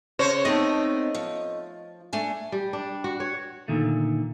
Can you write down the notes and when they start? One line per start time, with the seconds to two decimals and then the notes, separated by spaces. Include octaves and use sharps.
0.19 C#3 C5 C#5
0.45 A3 B3 C4 D#4 D#5
1.14 F3
2.13 A3 D4 G#5
2.52 G3
2.73 D4
3.04 F#4
3.20 C#5
3.68 A#2 D3 D#3 A3